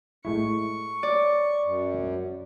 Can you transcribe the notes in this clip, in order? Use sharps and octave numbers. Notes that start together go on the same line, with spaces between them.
A2 G#3 E4 C#6
D5
F#2